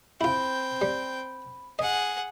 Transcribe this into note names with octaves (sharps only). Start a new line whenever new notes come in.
C4 E4 F4 G5 B5
G3
G#4 D#5 F#5